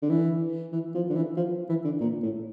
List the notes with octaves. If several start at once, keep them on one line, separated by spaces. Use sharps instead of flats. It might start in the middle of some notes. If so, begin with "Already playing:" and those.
D3
E3
E3
F3
D3
E3
F3
E3
D3
A#2
A2